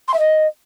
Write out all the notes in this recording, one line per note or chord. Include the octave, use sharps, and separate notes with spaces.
C6
E5
D#5